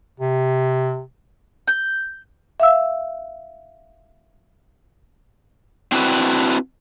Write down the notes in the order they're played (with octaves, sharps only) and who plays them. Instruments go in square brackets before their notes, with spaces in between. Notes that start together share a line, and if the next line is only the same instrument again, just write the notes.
[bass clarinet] C3
[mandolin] G6
[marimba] E5 F5 E6
[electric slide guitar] C4 D4 E4 F#4 A4 B4